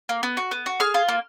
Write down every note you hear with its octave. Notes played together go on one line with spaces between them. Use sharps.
A#3
B3
F#4
B3
F#4
G#4 F6
F4
A#3